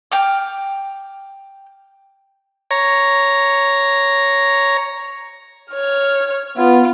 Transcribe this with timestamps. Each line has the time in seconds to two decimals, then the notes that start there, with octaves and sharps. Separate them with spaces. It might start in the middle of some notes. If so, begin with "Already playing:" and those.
0.12 G5 D6 F6
2.71 C#5 A#5
5.72 C#5 F6
6.57 B3 F4